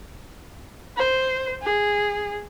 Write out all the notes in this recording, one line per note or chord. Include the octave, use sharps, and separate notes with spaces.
C5
G#4